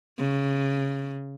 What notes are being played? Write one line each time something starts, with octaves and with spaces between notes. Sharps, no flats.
C#3